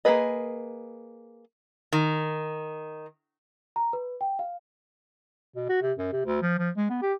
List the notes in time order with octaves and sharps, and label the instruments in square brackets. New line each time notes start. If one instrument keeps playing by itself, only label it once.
[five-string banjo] A#3 D4 G#4 B4 D#5
[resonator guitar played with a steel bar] D#3
[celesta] A#5
B4
G5
F5
[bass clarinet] B2
F#4
C3
F#2
C3
D2
F3
F3
G#3
B3
G4